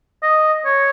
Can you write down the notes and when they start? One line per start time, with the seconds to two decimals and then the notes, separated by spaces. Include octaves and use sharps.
0.23 D#5
0.65 C#5